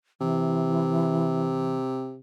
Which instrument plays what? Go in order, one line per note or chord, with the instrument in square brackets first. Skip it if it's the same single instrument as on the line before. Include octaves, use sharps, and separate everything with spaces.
[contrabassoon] C3 [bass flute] E3